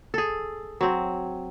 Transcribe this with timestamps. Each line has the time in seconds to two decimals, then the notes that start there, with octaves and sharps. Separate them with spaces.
0.14 G#4 A4
0.81 F#3 C4